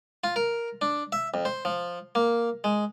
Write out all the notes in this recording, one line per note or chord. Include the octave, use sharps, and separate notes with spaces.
F4
A#4
D4
E5
F2
C5
F3
A#3
G#3